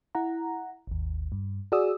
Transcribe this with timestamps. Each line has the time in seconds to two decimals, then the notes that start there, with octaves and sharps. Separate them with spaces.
0.15 E4 F#5 A#5
0.87 G#1 D#2
1.32 G2
1.72 F#4 G#4 D5 D#6 E6